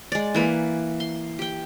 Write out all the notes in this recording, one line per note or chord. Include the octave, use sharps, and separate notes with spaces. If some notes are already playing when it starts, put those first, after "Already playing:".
G#3 D5
E3 A#3 B4
C6
G4 G5